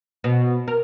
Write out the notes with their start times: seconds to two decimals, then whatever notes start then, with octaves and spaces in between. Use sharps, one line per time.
0.24 B2
0.68 A#4